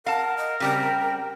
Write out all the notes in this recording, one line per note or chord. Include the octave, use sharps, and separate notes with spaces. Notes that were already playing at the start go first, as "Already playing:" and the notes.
A#4 F5 F#5 A5
D#5
C#3 G3 C4 G5